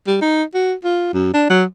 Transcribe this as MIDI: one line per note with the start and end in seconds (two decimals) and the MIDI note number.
0.07 0.17 55
0.21 0.43 63
0.54 0.73 66
0.84 1.13 65
1.13 1.32 42
1.34 1.45 62
1.50 1.63 54